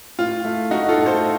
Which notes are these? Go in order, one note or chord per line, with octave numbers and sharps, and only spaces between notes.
A2 F4
A3
A3 D#4 F#4
F4 A4
A2
A4 C5